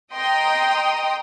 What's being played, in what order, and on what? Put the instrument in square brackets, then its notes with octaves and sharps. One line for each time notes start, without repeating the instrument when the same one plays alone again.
[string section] D#5 G5 A#5 C6 D#6